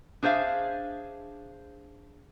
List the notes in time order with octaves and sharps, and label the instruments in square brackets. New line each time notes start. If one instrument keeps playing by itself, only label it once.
[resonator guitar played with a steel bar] D4 G#4 C5 E5 F5